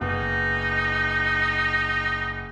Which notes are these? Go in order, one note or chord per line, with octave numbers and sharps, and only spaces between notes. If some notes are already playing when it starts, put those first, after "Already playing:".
F#1 B3 D#4